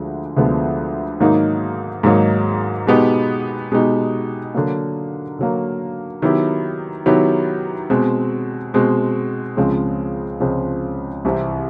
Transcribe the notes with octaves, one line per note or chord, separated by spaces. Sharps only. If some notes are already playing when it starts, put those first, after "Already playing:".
Already playing: D2 D3 F3 G#3
D2 D3 F3 G#3 B3
G#2 D#3 F#3 A#3 D#4
G#2 D#3 F#3 A#3 D#4
B2 G#3 B3 D#4 G4
B2 G#3 B3 D#4 G4
D3 F#3 A#3
D3 F#3 A#3
D#3 F#3 B3 E4 G4
D#3 F#3 B3 E4 G4
B2 G#3 C4
B2 G#3 C4
C#2 C#3 F3 G#3 C4
C#2 C#3 F3 G#3 C4
C2 C3 E3 G3 C4